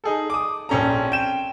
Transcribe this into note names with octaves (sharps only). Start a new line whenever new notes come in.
D#4 G#4 A4
D6 D#6
A#1 C4 C#4 A4 A#5
G5 E7